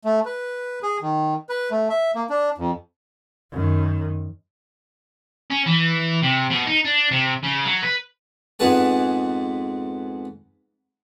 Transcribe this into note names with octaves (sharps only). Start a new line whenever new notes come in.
A3
B4
G#4
D#3
B4
A3
E5
A#3
D4
F2
F#2 D#3
C#4
E3
C3
B2
D#4
D4
C3
C#3
F#3
B4
F2 G#2 B3 G#4 B4 A5